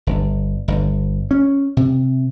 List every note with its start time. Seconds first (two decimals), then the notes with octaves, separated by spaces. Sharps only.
0.07 G1
0.68 G1
1.31 C#4
1.77 C3